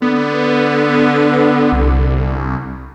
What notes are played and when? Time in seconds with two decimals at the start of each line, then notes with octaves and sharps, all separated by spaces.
0.02 D3 B3
1.72 C2